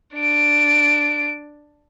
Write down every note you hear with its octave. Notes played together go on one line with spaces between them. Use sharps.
D4 D7